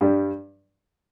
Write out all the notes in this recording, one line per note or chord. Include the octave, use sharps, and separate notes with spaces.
G2 G3